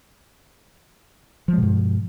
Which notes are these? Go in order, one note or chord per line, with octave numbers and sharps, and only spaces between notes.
G2 B2 F3 G#3